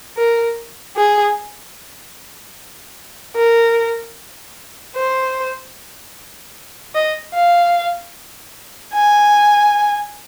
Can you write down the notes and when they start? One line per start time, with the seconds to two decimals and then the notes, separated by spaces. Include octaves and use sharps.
0.17 A#4
0.97 G#4
3.36 A#4
4.96 C5
6.95 D#5
7.34 F5
8.94 G#5